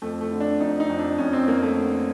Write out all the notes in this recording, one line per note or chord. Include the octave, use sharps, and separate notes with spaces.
F2 A3
A3
D3
D4
F2 D#4
D#4
F2
D4
F2 C#4
C4
F2 A#3
A3
D3